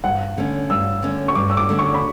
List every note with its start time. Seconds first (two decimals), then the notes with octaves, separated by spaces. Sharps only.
0.04 G2 F#5
0.37 D3 A3 C#4
0.70 G2 E6
1.02 D3 A3 C#4
1.28 C#6
1.35 G2 D6
1.50 E6
1.57 D6
1.69 D3 A3 C#4
1.79 C#6
1.94 B5